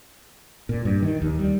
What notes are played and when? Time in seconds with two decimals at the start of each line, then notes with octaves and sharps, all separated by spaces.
0.69 A#2
0.85 G2
1.03 D#3
1.22 D#2
1.39 G3